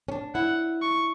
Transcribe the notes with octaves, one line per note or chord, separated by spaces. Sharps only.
C#4
D4
E4 F#5
C#6